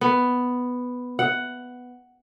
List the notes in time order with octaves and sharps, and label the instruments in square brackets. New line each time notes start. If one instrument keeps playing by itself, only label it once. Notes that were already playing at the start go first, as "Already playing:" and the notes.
[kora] B3
F#5